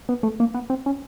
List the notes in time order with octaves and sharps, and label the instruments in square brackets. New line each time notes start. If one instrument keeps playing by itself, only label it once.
[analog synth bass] B3
A3
A#3
B3
C4
C#4